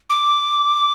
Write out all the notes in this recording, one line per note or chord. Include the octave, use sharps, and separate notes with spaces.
D6